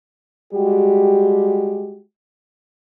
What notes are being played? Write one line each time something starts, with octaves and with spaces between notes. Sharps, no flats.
G3 G#3 F#4 G4